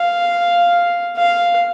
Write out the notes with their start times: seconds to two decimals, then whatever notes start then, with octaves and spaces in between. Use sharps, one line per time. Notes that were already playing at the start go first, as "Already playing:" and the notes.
Already playing: F5
1.17 F5